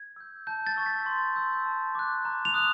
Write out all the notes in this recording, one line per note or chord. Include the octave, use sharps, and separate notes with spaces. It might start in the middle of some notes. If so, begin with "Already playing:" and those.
Already playing: G#6
E6 G6
A5 G6
A6
C#6 E6
B6
C6
E6 G6
A5
D6 F#6
A#5
F7
D#6 F#6